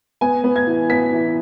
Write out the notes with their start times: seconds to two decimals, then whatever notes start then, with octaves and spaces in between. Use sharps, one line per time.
0.21 B3 G#5
0.44 B3
0.56 G#6
0.67 E3
0.90 B3 B6
1.12 E3